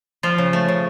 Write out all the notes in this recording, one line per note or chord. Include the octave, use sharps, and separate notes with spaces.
F3 F4
C#3
A3
C#3